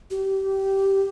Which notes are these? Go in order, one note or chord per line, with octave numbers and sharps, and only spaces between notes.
G4